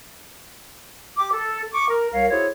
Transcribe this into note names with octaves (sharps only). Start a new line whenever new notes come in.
G4 D6
A4
C#6 D6
A#4
C2 A#4 C#5 F5
E4 F#4 G#4 A4 C5 C#5